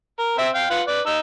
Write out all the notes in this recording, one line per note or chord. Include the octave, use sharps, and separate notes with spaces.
A#4
C4 E5
F5 G5
F4 B4 F#5
B4 D5
D#4 E6